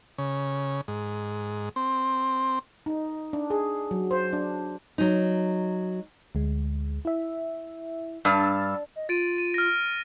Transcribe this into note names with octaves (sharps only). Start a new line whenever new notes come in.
C#3
G#2
C4
D#4
D4
G#4
F#3
C5
D4
F#3 D#4
D2 G#3
E4 E5
G2 E6 F6 A6
D#5
F4 A6 D7 D#7
D#7
F6 A#6